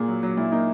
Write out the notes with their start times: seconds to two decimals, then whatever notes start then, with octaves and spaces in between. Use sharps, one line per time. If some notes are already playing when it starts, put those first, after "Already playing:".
Already playing: A#2 A#3 G#4
0.08 F#3
0.23 F#3
0.37 A#2 E4
0.52 A#3 D#4